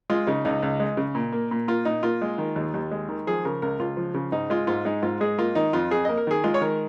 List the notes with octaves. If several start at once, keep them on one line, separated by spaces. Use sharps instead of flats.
G#3 F4
C#3 D#4
C#2 D#4
C#2
G#3
C#3
A#2
A#3
A#2
A#3 F4
A#2 D#4
A#3 F4
G#3
D#3
D#2
D#2
G#3
D#3
F3 G#4
C#3 A#4
C#2 A#4
C#2 F4
F3
C#3
G#2 D#4
G#3 F4
G#2 F4
G#3 D#4
G#2 F4
G#3 G#4
A#3 F4
D#3 D#4
F2 F4
F2 G#4
A#3 D#5
A#4
D#3 G#4
G#3 F4
C#5
D#3 A#4